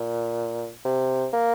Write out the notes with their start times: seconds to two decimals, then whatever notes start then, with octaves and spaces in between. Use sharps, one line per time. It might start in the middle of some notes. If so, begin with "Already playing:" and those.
Already playing: A#2
0.85 C3
1.33 A#3